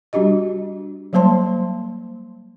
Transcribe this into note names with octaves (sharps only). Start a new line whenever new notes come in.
G3 D4 F#4 G4 D#5
F#3 G3 A#3 C5 A5 C6